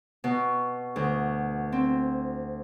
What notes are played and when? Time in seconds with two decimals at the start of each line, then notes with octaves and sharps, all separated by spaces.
0.24 B2
0.96 D2
1.72 C4